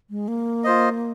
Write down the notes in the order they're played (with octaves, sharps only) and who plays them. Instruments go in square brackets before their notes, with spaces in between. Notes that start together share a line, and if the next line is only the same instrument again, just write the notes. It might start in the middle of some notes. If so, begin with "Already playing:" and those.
[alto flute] G#3
A#3
[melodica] F4 C5 D#5